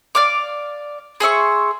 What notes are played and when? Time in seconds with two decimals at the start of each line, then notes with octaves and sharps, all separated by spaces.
0.15 D5 F5 D6
1.20 G#4 C5 E5 C#6